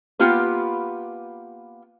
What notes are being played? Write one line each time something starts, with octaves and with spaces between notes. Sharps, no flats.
A#3 B3 F4 G4 B4